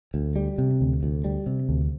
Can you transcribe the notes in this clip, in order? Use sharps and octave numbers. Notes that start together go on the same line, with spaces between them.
D2
G3
C3
D2
D2
G3
C3
D2